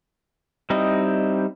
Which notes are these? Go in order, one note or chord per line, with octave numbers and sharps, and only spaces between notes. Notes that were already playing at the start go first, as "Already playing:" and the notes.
G3 C4 D#4 E4 D#5